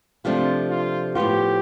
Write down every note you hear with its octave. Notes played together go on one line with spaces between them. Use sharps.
C3 F3 A3 D4 F4
F4
A2 F3 B3 F4 G4